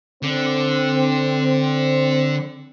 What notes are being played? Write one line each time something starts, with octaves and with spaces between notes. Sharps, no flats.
D3 C4